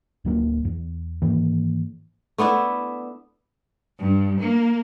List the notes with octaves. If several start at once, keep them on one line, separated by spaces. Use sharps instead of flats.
D1 F#3 A#3
E2
G#2 D#3 E3 A#3
A3 B3 D4 E4
G2
A#3